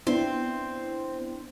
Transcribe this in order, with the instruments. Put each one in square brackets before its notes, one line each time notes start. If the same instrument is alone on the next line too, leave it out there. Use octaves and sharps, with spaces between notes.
[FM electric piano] B3 D4 E4 [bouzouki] C4